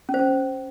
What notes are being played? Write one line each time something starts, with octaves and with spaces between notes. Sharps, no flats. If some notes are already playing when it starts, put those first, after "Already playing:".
C#4
C5
C#4